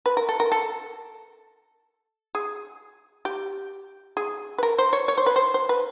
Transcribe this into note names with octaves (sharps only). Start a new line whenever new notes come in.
B4
A#4
A4
A#4
A4
G#4
G4
G#4
B4
A#4
C5
C#5
C#5
C5
B4
C5
C5
B4